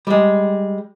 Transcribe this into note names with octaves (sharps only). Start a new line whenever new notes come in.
G3 G#3